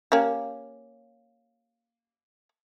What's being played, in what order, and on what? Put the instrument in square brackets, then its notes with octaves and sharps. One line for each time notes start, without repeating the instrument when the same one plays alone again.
[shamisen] A#3 C#4 G4